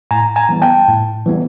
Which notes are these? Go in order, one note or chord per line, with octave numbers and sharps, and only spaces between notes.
A2 G#5 A#5
G#5 A#5
E3 G3 B3
G5 A5
A2
E3 G3 B3